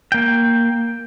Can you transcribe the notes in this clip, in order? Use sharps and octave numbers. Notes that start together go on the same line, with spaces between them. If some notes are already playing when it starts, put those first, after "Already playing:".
A#3 G5